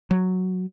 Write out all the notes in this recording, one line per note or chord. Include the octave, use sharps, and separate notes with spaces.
F#3